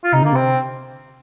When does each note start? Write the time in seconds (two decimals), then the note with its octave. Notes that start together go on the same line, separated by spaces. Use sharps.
0.04 F4
0.12 C3 D#4
0.22 D3 A#3
0.33 C3 C4